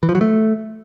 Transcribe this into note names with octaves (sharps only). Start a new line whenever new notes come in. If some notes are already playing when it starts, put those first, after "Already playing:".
E3
F3
F#3
A3